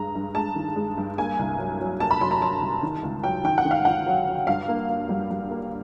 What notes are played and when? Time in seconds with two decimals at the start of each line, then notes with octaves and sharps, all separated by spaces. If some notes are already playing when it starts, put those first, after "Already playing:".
Already playing: G2 G#3 A#5
0.15 G2
0.35 G#3 A5
0.55 D#3
0.76 G#3
0.97 G2
1.18 A#3 G#5
1.39 C2
1.59 F#3
1.80 F#3
2.00 A#3 A5
2.11 B5
2.21 F#3 C6
2.31 A#5
2.41 F#3 A5
2.61 C2
2.83 D#3
3.03 C#2
3.23 F#3 G5
3.44 D#3 G5
3.58 F#5
3.65 D#3
3.71 F5
3.85 D#3 F#5
4.06 F#3
4.27 F#3
4.47 G2 F5
4.68 A#3
4.89 A#3
5.09 G3
5.30 G3
5.51 A#3